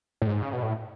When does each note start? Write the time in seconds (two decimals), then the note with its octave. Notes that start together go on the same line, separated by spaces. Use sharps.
0.22 A2
0.27 G#2
0.42 C#3
0.53 B2
0.63 A2